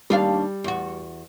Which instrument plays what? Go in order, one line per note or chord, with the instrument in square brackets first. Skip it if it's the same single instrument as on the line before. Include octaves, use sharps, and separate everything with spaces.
[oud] D#2 D4 F5 [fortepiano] G3
[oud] E2 F#4